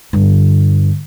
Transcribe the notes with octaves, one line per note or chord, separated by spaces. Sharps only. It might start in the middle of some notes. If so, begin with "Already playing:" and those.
G2 D3